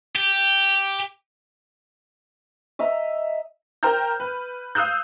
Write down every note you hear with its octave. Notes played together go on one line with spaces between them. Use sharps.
G4
D#5 E5 A#5
A#4 C5 G5 A#5 F6 G6
B4
F5 D#6 E6 F#6 G6